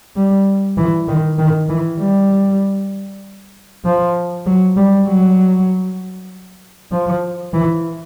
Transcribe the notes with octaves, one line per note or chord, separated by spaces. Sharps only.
G3
E3
D#3
D#3
E3
G3
F3
F#3
G3
F#3
F3
E3